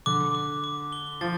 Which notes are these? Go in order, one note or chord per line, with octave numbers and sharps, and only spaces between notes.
D3 D6
D6
D6
G7
F3 A6